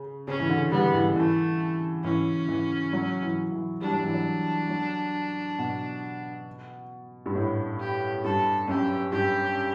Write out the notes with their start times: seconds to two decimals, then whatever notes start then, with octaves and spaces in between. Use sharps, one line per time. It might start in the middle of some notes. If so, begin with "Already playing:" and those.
Already playing: C#3
0.28 C#3 C#4
0.40 E3
0.49 D3
0.71 G3 B3
0.94 E3
1.16 E3 A3
2.04 E3 C#4
2.49 E3
2.93 F#3
3.22 E3
3.52 E3
3.81 G3 D4
3.93 F#3
4.03 E3
4.14 F#3
4.70 F#3
5.59 B2
7.26 G2
7.35 A2
7.80 G4
8.24 G2 A4
8.68 F#2 G4
9.12 G2 G4